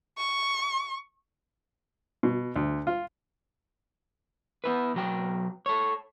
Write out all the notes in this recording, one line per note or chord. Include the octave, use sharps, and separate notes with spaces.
C#6
B2
D2
F4
B3 E4 B4
B1 F#3 G5
A4 C#5